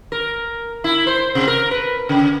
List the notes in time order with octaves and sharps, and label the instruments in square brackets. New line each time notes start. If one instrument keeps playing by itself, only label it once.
[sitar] A#4
E4
C5
C3
A#4
B4
C#3